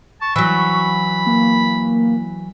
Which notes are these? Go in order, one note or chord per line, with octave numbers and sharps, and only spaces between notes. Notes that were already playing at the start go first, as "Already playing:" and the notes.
A5 C#6
E3 F#3 B5
A#3